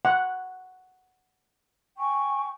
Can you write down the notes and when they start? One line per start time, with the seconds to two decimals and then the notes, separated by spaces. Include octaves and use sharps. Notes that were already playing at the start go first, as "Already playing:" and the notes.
0.05 F#5
1.97 G5 G#5 C#6